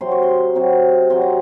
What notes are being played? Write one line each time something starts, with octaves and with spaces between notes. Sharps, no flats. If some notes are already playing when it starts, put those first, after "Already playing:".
C3 F#3 C4 C6
C#6
C6
C3 F#3 C4
C3 F#3 C4 C6
A#5